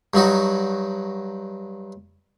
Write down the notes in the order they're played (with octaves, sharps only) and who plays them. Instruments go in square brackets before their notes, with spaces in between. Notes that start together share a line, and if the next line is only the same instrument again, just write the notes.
[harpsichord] G2 F#3 D#4 F#4